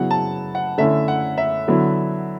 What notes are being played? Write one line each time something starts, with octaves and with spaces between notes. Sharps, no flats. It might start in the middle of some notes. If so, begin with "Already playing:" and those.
Already playing: C#3 F#3 B3 E4 F#5
A5
F#5
D3 A3 C#4 E4 E5
F#5
E5
D3 F#3 B3 E4